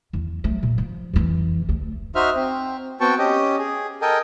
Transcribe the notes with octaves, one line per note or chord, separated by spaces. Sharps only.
E2
F#3 A3
A#2
F3
F2 E3
D2 A3
D#4 F#4 C5 E5 F6
C4
B3 C4 F#4 G5 A5 C#6
C#4 G4 D#5
G#4
A4 A#4 D#5 G5 G#5